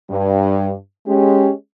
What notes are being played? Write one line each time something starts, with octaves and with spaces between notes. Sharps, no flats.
G2
G#3 C#4 G4